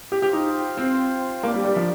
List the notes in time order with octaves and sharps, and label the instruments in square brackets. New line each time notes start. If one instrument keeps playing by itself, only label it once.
[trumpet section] F4 C5 G5 [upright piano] G4
[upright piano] G4
D#4
C4
[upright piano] A#3 [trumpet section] D4 G4 A#4 D5
[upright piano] G3
G3
F3